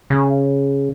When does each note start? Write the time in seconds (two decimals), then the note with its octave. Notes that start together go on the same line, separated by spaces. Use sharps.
0.10 C#3